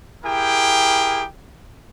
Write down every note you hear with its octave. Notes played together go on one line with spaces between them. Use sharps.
E4 G4 G#4 A#4 G5